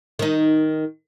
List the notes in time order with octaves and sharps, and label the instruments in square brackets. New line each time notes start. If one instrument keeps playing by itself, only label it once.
[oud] D#3 D#4